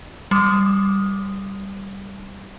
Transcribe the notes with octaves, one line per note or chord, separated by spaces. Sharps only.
G3 D6 D#6